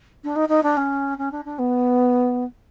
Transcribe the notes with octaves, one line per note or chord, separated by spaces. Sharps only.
D4
D#4
D#4
D4
C#4
C#4
D4
D4
B3